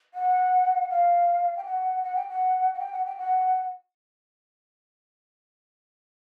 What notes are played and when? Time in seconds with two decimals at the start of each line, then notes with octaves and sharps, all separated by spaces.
0.14 F#5
0.90 F5
1.57 G5
1.65 F#5
2.03 F#5
2.16 G5
2.29 F#5
2.74 F#5
2.79 G5
2.92 F#5
3.05 G5
3.17 F#5